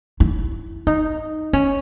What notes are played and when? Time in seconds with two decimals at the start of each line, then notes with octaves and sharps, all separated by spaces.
0.20 E4
0.87 D#4
1.53 C#4